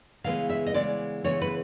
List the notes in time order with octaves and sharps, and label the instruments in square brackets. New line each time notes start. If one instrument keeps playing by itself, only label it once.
[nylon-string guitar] C#3 E3 G#3 B3 F5
E5
D#5
C#3 E3 G#3 B3 D5
C#3 E3 G#3 B3 C#5
B4